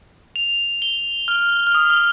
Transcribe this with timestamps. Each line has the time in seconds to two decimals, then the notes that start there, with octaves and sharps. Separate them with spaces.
0.36 F7
0.82 G7
1.28 F6
1.67 F6
1.75 D#6
1.90 F6